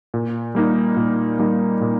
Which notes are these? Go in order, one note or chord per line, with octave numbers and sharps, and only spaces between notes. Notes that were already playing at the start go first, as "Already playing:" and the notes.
A#2
G3 A#3 D#4
A#2
G3 A#3 D#4
A#2